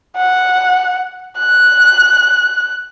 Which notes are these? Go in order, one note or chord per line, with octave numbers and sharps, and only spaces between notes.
F#5
F#6